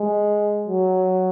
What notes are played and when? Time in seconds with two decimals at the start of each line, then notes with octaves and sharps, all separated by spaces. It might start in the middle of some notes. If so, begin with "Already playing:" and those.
Already playing: G#3
0.67 F#3